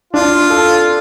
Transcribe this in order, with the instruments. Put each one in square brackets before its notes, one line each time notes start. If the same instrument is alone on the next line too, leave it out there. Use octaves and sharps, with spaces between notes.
[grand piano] D4 [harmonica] F4
[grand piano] A4